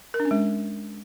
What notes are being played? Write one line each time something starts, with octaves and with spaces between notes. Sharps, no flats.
A#4
D4
C#4
G#3